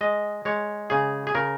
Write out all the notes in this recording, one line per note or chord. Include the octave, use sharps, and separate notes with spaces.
G#3 D#5
G#3 C#5
C#3 G#4
G#4
C#3 A#4